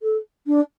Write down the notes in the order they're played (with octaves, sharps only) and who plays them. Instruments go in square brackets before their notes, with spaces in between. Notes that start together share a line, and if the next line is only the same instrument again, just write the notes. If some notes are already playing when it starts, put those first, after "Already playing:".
[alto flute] A4
D4